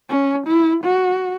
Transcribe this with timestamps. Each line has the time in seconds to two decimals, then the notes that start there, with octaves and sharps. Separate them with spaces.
0.09 C#4
0.47 E4
0.84 F#4